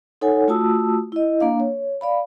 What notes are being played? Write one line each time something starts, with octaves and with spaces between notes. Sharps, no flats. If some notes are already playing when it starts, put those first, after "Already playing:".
D#4 A4 C#5 F#5 G#5
A3 F4 F#4 A5 D#6 E6
E4 D#5
A#3 D4 F5
C#5
D5 F5 B5